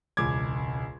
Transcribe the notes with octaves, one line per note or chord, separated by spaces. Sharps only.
E1 C#2 D6 G#6